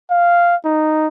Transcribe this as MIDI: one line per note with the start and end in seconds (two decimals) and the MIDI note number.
0.10 0.56 77
0.65 1.07 63